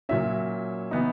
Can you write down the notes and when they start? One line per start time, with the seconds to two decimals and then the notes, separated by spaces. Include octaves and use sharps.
0.09 A#2 F#3 C#4 E5
0.91 E3 B3 D#4